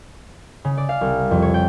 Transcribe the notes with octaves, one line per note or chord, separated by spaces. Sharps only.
C#3
D5
F5
C2
F2
C#5
G5